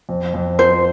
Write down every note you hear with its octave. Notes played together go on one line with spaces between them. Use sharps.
F2
F2
F3 C5